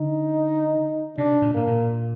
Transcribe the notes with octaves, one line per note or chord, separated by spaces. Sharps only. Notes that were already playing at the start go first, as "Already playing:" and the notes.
Already playing: D3 D#4
C3 D4
A#2
A2 A#3
A#2